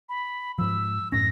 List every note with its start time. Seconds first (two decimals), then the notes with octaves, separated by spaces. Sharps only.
0.09 B5
0.59 G#2 F3 E6
1.12 F#2 A2 C#4 A#6